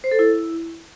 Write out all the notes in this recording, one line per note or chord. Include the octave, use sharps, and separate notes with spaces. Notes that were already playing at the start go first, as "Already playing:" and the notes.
C5
A4
E4